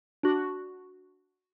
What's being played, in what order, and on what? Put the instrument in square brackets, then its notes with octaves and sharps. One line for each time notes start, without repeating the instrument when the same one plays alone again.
[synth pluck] D4 F#4